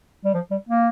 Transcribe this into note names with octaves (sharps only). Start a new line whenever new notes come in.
G3
F3
G3
A#3